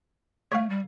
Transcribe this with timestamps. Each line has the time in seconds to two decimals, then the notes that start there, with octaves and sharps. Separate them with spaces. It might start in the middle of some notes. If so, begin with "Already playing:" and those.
0.52 A3 C#5 F5
0.70 G3